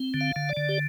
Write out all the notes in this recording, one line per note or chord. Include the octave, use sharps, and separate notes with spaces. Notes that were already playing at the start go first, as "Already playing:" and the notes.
Already playing: C4
D3
F5
D3
D5
D3
G4